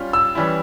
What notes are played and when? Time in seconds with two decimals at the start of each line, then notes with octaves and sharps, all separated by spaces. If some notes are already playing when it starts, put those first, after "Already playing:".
Already playing: G3 C#4 F4
0.13 E6
0.35 E3 G3 C#4 E4